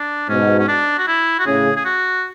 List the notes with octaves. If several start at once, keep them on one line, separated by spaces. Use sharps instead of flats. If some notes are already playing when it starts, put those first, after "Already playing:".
Already playing: D4
G#2 B2 C#4
C#4
D4
F#4
E4
F#4
A2 C#3 G#4
G#4
F#4